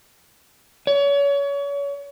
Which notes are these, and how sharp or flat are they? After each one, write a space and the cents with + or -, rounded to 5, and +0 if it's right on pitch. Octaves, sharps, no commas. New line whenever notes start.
C#5 +35